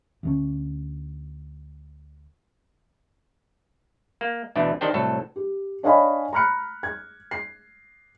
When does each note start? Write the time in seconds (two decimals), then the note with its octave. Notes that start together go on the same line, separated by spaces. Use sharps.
0.23 D2 D3 C#4
4.21 A#3
4.56 D2 B2 D3 E3 A3
4.81 D#3 D4 G4 C5 G5
4.94 C2 A2 F#3 A4
5.36 G4
5.83 D4 C#5 D#5 F5 G#5 B5
6.33 A#5 B5 F6 F#6 C#7
6.83 G#6
7.31 C7